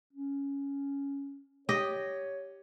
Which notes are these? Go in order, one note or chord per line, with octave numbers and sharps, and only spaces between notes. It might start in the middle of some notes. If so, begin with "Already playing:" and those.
C#4
G4 C#5 D#5